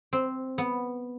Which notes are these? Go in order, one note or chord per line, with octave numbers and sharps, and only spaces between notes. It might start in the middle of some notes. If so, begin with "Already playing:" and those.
C4
B3